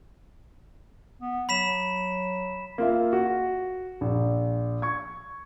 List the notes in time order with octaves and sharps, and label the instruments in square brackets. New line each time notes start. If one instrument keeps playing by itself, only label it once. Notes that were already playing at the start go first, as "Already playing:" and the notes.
[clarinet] B3
[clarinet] F#3 [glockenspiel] B5 B6 E7
[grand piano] A#3 F4 E5
F#4
A#1
C#6 G#6